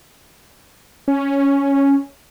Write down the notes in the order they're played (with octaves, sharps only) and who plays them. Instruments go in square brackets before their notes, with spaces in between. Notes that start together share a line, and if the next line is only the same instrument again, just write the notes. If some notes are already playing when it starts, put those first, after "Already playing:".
[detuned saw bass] C#4